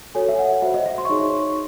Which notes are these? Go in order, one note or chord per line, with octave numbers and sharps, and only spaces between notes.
F#4 A4 C#5 G#5
E5
F#5
F#4 C5 E5
D#5
E5
C6
C#6
D#4 G#4 C#5 C6